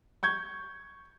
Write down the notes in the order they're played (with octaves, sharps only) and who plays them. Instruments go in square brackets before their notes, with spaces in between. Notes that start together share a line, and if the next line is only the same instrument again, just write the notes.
[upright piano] C#6 G6 G#6